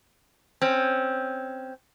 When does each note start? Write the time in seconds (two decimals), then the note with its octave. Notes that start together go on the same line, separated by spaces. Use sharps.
0.62 C4 C#4